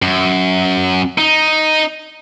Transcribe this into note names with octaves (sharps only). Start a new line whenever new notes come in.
F#2
D#4